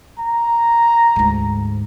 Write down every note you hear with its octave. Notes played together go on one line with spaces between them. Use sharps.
A#5
D2 G#2